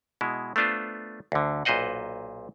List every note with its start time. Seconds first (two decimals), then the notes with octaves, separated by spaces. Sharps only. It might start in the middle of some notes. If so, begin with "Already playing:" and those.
0.21 B2 G#3 E4
0.56 A3 B3 D4 F4 C5
1.32 D2 D3
1.65 B1 A#2 B4 C5 D#5 F#5